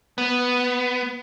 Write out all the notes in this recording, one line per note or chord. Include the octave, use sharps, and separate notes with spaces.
B3